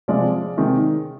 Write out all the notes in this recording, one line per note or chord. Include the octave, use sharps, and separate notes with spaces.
C3 F3 G#3 D5 F5
C3 D#3 G#3